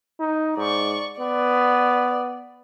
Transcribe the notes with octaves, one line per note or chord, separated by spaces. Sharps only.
D#4
G#2 D5 C#6
B3 D5